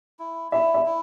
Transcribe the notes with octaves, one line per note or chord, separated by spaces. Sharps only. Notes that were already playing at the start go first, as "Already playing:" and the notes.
E4
E4 E5
E5
E4